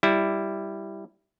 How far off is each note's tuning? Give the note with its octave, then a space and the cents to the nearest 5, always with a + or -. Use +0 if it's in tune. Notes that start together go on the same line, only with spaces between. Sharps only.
G3 +0 E4 +0